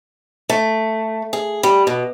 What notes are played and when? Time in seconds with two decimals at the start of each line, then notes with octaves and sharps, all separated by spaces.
0.50 A3
1.33 G#4
1.63 G3
1.87 B2